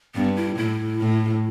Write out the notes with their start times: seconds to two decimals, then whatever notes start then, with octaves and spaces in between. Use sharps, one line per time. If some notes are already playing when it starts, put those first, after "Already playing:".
0.15 G2 B3
0.36 E4
0.57 A2 E4
1.00 A2